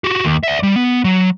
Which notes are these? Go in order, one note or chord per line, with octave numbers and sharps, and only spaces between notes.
F#4 G4
D#2
D5 E5
G3
B3
F#3